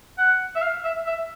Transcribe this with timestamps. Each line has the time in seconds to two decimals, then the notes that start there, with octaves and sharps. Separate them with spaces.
0.18 F#5
0.56 E5
0.62 F5
0.84 E5
1.07 E5